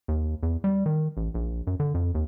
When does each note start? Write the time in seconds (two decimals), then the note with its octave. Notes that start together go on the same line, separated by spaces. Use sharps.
0.08 D#2
0.43 E2
0.64 G3
0.86 D#3
1.17 A1
1.34 A#1
1.67 F#2
1.80 D3
1.94 F2
2.15 D#2